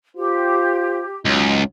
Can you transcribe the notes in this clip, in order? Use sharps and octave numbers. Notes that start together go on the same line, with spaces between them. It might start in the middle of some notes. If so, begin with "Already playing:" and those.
F4 G4 C5
C#2 F#3 D#4